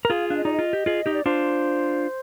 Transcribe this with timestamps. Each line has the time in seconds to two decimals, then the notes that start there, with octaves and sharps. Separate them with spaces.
0.05 A#4
0.09 F4 G#4 F5
0.29 D4 F5
0.37 D#5
0.45 D#4 D5
0.53 D#5
0.59 F4
0.73 G4
0.86 F4 G#4
1.06 D#4 G4
1.14 D5
1.25 D4 F4 C5